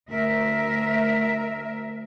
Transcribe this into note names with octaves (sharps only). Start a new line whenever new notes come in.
D2 A#4 E5